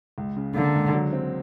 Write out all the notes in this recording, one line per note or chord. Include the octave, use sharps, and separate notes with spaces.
C#2
C#3
D3 A#3
C#2
F#3
C4